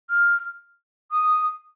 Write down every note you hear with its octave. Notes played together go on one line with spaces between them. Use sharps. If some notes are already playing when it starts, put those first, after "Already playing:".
F6
D#6